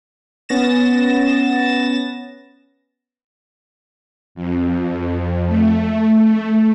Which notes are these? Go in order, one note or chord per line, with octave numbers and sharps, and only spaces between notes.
B3 C#4 A6 A#6 E7
F2
A3